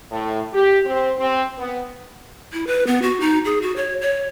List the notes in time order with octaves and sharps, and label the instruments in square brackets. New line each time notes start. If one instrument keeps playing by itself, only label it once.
[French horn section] A2
G4
C4
C4
B3
[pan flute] E4
B4
B3
F#4
D#4
G#4
F#4
C#5
C#5